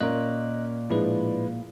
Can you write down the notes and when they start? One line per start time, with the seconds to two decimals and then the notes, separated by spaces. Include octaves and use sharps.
0.01 A#2 C#4 A#4 D#5 F#6
0.90 A2 F3 G#3 D4 E4 B4